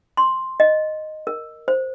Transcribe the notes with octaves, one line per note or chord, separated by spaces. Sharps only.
C6
D#5
A#4
C5